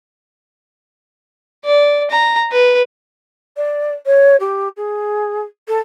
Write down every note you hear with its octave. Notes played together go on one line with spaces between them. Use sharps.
D5
A#5
B4
D5
C#5
G4
G#4
A4